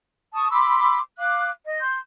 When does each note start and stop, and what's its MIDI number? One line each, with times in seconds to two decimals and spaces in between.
0.33 0.51 81
0.33 0.51 85
0.33 0.51 87
0.51 0.99 83
0.51 0.99 84
0.51 0.99 86
0.51 0.99 88
1.18 1.50 77
1.18 1.50 86
1.18 1.50 90
1.65 1.80 75
1.81 1.98 84
1.81 1.98 91